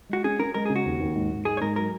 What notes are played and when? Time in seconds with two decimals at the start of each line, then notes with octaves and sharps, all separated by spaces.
0.09 G#3 F#4
0.24 C#4 G#4
0.39 C#4 A#4
0.54 G#3 A#4
0.65 C#3 G#4
0.76 F#4
0.85 D#2
1.00 D#2
1.15 G#2
1.31 G#2
1.45 G#3 G#4
1.57 C#5
1.61 G#2 A#4
1.76 F#3 A#4